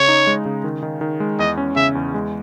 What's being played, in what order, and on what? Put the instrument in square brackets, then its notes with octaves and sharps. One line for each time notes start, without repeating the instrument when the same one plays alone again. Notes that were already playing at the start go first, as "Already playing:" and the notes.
Already playing: [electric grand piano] C#3 [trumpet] C#5
[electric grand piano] D#4
G#3
C#3
D#3
D#3
D#3
G#3
[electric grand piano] E2 [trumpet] D#5
[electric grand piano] C#4
[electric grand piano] C#3 [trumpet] E5
[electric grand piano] E2
G#3